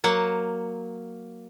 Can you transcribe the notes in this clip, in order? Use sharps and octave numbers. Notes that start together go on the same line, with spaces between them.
F#3 A#3 F#5